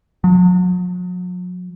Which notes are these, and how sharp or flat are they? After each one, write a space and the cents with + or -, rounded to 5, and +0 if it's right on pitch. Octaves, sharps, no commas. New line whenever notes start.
F#3 -40